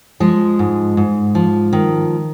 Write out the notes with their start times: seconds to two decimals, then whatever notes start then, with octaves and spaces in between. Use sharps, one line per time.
0.20 F3 G#3
0.59 G#2
0.97 G#2
1.35 F3
1.73 D#3